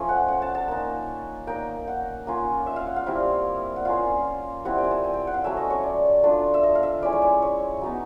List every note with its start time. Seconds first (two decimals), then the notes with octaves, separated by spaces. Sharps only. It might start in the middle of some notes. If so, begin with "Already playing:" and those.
Already playing: F3 A3 C#4
0.09 F#5
0.28 F#5
0.42 A5
0.55 A5
0.68 A#3 D#4
1.47 A#3 D#4 G5
1.88 F#5
2.27 A#3 C#4 F4
2.66 E5
2.76 F5
2.87 F#5
2.96 F5
3.06 G3 C4 E4
3.76 F#5
3.85 A#3 C#4 F4 F5
4.65 G3 C4 E4 F#5
4.78 G5
4.84 G#5
4.91 A5
5.04 G#5
5.14 G5
5.27 F#5
5.34 F5
5.44 F#3 A3 C#4 E5
5.57 D#5
5.70 C#5
5.83 D5
6.24 A3 D4 F4
6.54 E5
6.63 D#5
6.75 F5
6.83 E5
7.02 G#3 C#4 E4 D5
7.13 C#5
7.22 D5
7.42 C#5
7.81 F#3 B3 D#4